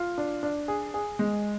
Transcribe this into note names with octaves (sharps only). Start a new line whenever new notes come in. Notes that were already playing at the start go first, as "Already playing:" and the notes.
Already playing: F4
D4
D4
G#4
G#4
G#3